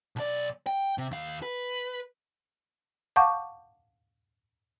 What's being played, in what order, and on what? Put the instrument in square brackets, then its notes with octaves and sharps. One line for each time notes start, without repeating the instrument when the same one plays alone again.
[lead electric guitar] B1 D5
G5
C3
D#2 F5
B4
[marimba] F5 F#5 A5 C#6 D6 G6